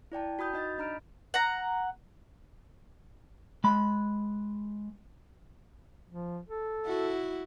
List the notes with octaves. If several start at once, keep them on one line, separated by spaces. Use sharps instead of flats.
E4 D5 G5 A5
F#4 B5 D#6 G6
D#4 D#5 G6 A6
D4 D#5 A#5 B5 F6 D7
F#5 A#5
G#3 B5
F3
A4
E4 F#4